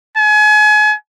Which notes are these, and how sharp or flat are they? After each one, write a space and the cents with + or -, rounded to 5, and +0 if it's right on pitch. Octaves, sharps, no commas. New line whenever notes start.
G#5 +35